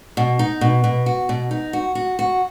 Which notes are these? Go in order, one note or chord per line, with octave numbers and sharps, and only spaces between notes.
B2
D#4
B2
B2
F#4
B2
D#4
F#4
F#4
F#4